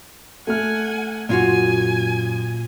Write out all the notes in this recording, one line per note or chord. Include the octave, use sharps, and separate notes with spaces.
A3 F#5 G#5 F6
F#2 A#2 F4 F#4 G#5